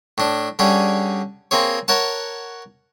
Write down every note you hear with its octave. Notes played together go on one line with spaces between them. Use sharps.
A2 D4
D3 G3 C#4 G#4
A#3 C4 G#4 C#5
A#4 C#5 F#5 A5